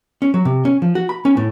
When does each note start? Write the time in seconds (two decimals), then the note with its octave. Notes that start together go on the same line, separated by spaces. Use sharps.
0.22 C#4
0.34 F#3
0.45 C3
0.65 C#4
0.82 F3
0.95 F#4
1.09 B5
1.25 C#4
1.37 A2